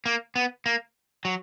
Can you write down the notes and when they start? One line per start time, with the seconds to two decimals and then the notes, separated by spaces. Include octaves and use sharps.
0.06 A#3
0.36 B3
0.66 A#3
1.25 F#3